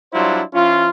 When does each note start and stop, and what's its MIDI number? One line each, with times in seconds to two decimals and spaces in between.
0.13 0.42 54
0.13 0.42 55
0.13 0.42 62
0.13 0.42 64
0.13 0.42 65
0.13 0.42 72
0.54 0.89 53
0.54 0.89 61
0.54 0.89 64
0.54 0.89 65